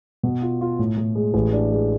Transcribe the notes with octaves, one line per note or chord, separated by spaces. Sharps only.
B2
F4
F4
A2
A2
G#3
A1
D4
G#3